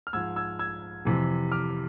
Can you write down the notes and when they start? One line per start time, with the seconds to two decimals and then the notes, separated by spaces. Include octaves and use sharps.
0.07 F6
0.13 G#2 F3 E6 G#6
0.36 E6 G#6
0.59 E6 G#6
1.05 F2 C3 E3
1.52 D6 F6